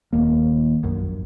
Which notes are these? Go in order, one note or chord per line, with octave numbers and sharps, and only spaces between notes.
D#1 D#2 A#3
A#1 F#2